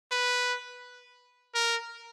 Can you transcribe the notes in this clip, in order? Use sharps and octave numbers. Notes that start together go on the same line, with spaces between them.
B4
A#4